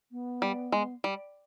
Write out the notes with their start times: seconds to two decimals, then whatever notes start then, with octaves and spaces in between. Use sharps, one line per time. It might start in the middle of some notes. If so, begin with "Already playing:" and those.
0.11 B3
0.42 G3
0.72 G#3
1.04 G3